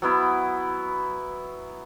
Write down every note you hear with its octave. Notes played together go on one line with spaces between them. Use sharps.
F#3 B3 E4